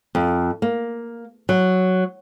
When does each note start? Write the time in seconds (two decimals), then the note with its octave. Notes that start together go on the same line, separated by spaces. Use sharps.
0.15 F2
0.62 A#3
1.49 F#3